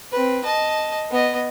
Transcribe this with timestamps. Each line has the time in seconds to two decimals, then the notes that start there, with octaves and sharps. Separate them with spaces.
0.11 C4 B4
0.44 D#5 A5
1.11 B3 D#5